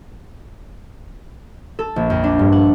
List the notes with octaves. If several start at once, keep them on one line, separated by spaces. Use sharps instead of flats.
A4
A#1
F2
D4
G2
F#5